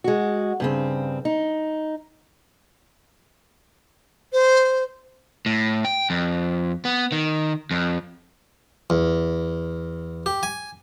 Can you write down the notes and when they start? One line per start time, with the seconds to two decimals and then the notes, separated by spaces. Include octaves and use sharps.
0.04 G#3 F#4
0.60 G2 C#3 C4
1.25 D#4
4.33 C5
5.46 A2
5.85 G5
6.10 F2
6.85 B3
7.12 D#3
7.71 F2
8.90 E2
10.26 G4
10.43 G#5